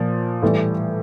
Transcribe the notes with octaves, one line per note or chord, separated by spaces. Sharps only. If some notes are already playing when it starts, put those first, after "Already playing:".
Already playing: A#2 F3
A2 E3 G3